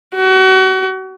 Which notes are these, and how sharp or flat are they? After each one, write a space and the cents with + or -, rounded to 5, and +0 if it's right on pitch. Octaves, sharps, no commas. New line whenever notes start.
F#4 +35